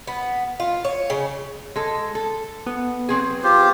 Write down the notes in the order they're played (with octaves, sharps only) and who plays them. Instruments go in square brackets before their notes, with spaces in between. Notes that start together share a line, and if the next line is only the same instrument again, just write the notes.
[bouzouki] B3
F4
C#5
C#3
[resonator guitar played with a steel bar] G#3 A4
A4
[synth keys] B3
[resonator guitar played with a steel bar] F#3 C4 G#4
[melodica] F4 G4 C5